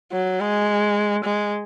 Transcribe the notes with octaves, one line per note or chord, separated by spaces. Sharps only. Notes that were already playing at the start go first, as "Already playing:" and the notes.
F#3
G#3
G#3